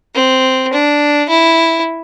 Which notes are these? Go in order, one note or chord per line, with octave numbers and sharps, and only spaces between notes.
C4
D4
E4